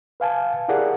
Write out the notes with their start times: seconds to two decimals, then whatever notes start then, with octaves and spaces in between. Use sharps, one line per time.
0.20 B4 F5 G#5 A5
0.68 E4 G4 G#4 A#4 D5 F#5